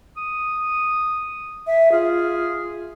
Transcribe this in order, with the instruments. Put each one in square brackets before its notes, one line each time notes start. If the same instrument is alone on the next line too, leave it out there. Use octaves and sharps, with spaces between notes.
[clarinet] D#6
[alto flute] E5
[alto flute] F4 [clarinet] G#4